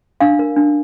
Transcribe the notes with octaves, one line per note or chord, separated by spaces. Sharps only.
D4 F5
A#4
D4